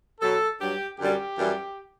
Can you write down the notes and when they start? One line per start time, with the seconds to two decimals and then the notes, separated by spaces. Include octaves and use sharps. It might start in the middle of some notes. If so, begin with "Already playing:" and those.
0.21 B2 F#3 A4
0.60 G2 F#3 G4
0.99 F#2 D3 G3 G4
1.38 F#2 E3 G3